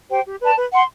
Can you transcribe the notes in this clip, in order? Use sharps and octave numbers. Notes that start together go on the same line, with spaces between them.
G4 C5 G5
G4
B4 D5 A5
B4
F#5 C6